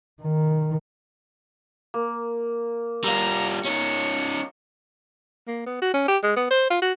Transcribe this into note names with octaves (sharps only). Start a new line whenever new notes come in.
D#3
A#3
G3 F4 A#5 E6
C#4 D#4 C#7
A#3
B3
F#4
C#4
G4
G#3
B3
C5
F4
F#4